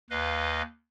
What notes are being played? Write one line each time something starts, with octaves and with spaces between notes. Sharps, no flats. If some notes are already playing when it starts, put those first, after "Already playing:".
D#2 B4 D#5 F5